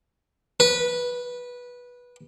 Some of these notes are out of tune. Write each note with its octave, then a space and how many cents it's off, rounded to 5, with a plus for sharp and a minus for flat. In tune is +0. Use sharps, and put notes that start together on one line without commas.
B4 -15